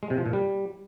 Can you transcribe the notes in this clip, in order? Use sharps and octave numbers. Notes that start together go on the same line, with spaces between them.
G#3
C3
F3
A#2
G3